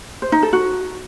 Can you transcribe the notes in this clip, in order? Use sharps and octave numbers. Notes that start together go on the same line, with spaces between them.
C5
D#4
A4
F#4